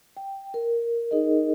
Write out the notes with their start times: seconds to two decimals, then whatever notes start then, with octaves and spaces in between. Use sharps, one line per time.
0.17 G5
0.54 A#4
1.11 D#4 G#4 A#4 D#5